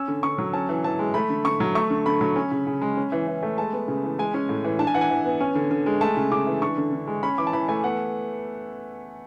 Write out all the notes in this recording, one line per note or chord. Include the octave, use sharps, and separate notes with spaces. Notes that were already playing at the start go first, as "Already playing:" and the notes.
Already playing: C#4 E6
D3
D3 C#6
F#3
C#4 A5
E3
E3 A5
G#3
A3 B5
D3
D3 C#6
F#3
A3 C#6
D3
D3 B5
F#3
C#4
C#3
C#3
G#3
C#4
E3
E3
A3
G#3 A5
B3
C#3
E3
G#3 G#5
C#4
A2
E3
D4 A5
G#5
E3 F#5
G#5
E3
B3
C#4
D3
D3
G#3
A3 A5
C#3
C#3 D6
E3
D4 C#6
D3
D3
G#3
C#4 B5
E3 D6
A5
E3 B5
A3 G#5
B3 F#5